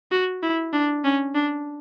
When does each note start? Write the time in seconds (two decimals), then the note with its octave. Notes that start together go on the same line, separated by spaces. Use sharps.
0.11 F#4
0.43 E4
0.73 D4
1.04 C#4
1.35 D4